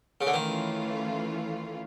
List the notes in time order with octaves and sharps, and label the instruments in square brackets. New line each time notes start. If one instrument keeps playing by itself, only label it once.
[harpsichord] C#3
D3
[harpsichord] D#3 [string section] E3 A3 C#4 F4